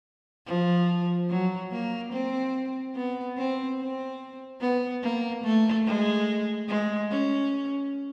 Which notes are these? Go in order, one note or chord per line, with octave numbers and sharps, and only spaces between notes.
F3
F#3
A#3
C4
B3
C4
C4
B3
A#3
A3
G#3
G#3
C#4